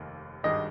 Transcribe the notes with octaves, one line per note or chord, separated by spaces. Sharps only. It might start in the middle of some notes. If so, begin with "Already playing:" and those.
Already playing: F1 D#2 D#3
G#1 G2 D#3 G#3 D#5